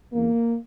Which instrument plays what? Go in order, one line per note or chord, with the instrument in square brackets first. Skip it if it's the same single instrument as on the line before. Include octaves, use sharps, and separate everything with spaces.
[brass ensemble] E2 C#3 E3 A#3